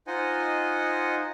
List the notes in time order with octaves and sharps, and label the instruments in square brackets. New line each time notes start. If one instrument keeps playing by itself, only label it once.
[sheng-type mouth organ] D#4 F4 C5 D#5 F#5 G#5